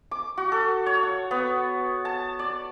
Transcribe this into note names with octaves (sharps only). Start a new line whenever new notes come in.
D6
F#4
A4
C#5
F#5
B3
A5
D5